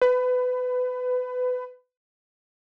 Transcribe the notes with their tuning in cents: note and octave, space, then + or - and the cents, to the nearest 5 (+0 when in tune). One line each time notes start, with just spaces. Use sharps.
B4 +25